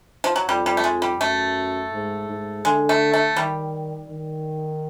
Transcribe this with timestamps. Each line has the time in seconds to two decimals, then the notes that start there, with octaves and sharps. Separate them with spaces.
0.24 F3
0.36 F#3
0.48 F2 G3
0.66 G3
0.77 A3
0.84 G#3
1.02 G3
1.20 F#2 A3
1.93 G#2
2.29 G#2
2.65 D3 G#3
2.89 A3
3.14 A3
3.37 D#3 G3
4.10 D#3